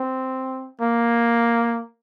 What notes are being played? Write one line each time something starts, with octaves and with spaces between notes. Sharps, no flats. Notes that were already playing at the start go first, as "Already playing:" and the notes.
Already playing: C4
A#3